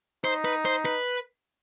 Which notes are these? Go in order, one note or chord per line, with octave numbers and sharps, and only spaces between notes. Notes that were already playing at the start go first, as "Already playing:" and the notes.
D#4 C5
B4
C5
B4